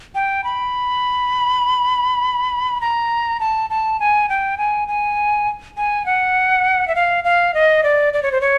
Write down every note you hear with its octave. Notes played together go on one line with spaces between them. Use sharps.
G5
B5
A#5
A5
A5
G#5
G5
G#5
G#5
G#5
F#5
E5
F5
F5
D#5
D5
D5
C#5
C5
C#5